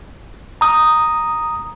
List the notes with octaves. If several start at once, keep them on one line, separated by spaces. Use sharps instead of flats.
A#5 D#6